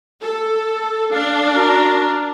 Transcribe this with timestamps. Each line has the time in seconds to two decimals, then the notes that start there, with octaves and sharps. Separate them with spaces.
0.22 A4
1.13 D4 F5
1.56 F#4 A#4